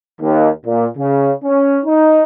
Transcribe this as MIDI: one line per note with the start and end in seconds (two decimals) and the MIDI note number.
0.20 0.49 39
0.66 0.86 46
0.98 1.31 49
1.44 1.79 61
1.85 2.23 63